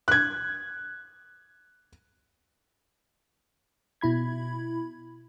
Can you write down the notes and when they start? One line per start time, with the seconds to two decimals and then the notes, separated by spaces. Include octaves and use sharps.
0.08 F#6 G#6
4.01 B2 E4 B5 G#6